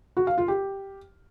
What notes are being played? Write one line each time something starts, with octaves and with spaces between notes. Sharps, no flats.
F#4
F5
F4
G4